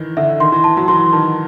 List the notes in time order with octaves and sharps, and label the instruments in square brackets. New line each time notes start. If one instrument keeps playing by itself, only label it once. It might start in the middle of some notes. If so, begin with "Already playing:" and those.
Already playing: [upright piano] D#3 E3
[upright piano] D3 [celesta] E5
[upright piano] D#3 [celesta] C6
[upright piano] E3
[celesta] A5
[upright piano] F#3
[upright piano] E3 [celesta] C6
[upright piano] D#3 [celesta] A5